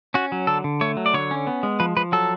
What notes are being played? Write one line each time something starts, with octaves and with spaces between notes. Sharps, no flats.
C#4 F#4
F#3
D3 A4
D3
A3 C#5
F#3
D5
D3 C#5
C#4
B3
G#3
F3 B4
F3 B4
F#3 A4